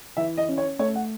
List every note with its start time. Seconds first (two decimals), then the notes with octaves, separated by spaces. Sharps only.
0.17 E3 E5
0.37 D#5
0.48 C#4
0.58 C#5
0.79 A3 C#5
0.95 F#5